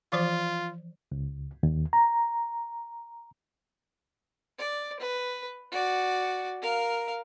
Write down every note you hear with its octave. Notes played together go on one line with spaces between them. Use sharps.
E3 F3 F4 C5
C#2
D#2
A#5
D5
B4
F#4 D5
A#4 F5